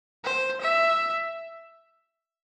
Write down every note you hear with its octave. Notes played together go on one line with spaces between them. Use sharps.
C5
E5